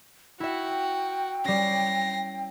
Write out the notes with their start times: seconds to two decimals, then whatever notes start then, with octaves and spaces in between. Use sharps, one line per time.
0.40 E4 F#4 E5 G5
1.45 G3 C#4 A#6 C7